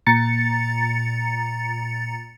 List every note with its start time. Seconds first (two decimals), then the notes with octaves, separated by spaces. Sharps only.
0.07 A#2 A#5 A6 C#7